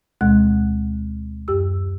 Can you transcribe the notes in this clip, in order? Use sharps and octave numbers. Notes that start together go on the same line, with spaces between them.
D2 B2 G#3 F#5 F#6
F#2 G4 E6